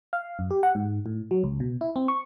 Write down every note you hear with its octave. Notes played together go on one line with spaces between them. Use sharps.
F5
F#2
G4
F#5
G#2
A2
F#3
C#2
B2
E4
C4
C#6